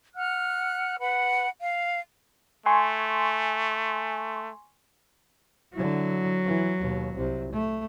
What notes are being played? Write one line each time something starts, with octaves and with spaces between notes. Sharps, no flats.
F#5 F6 F#6
B4 F#5 B5
F5
A3 G#5 C6 C#6
D3 F#3 E4
E3
D#2 B2
C2 C3
A3